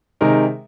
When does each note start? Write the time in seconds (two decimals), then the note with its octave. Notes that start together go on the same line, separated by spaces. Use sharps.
0.21 C3 D#3 G#3 D#4 A#4